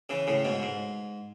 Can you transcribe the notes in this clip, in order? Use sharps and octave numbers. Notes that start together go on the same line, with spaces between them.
C#3 E3
A2 C#3
G#2 B2
G#2